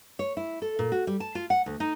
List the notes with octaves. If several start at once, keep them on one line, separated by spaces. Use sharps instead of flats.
C#5
E4
A4
A#2
F#4
G3
A5
F4
F#5
D2
D#4